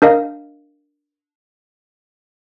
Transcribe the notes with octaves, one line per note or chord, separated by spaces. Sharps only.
D4 A#4 D#5 F5